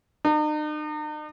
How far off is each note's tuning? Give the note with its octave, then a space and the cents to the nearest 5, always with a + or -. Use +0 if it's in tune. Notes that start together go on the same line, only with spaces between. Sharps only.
D#4 -45